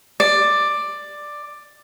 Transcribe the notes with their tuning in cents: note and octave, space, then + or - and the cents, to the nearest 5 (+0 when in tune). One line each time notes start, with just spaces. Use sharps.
D5 +10